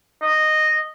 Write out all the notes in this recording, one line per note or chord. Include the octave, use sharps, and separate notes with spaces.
D#5